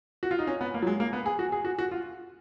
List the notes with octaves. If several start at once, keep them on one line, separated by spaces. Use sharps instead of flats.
F#4
F4
D#4
C#4
B3
A#3
F#3
G#3
A#3
B3
G#4
F#4
G#4
F#4
F#4
F4